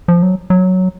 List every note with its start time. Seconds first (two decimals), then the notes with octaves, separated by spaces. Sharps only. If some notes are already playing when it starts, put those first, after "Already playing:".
0.08 F3
0.22 F#3
0.50 F#3